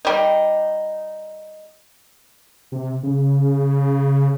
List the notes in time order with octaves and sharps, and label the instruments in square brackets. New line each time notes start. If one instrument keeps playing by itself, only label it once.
[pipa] G3 D#4
[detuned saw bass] C3
C#3